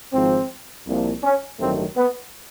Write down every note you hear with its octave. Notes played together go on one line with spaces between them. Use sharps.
G#1 G#2 F3 C4
C2 A#2 F3
C#4
A1 G2 D#3 F#3 A3 C4
B3